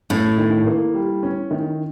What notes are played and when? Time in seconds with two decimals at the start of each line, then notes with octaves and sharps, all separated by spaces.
0.10 A2 C#4
0.38 D#3
0.66 A#3
0.94 G3
1.23 C#4
1.51 D#3